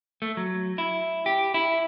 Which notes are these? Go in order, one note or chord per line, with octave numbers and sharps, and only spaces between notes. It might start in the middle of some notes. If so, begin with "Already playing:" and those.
A3
F#3
E4
G4
E4